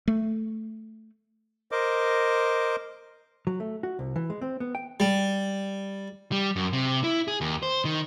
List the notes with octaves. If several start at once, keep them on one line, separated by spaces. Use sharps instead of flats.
A3
A#4 C5 D#5 D6
F#3
A3
F#4
C2
E3
G#3
C4
B3
G5
G3
G3
F#2
C3
E4
G#4
D#2
C5
D#3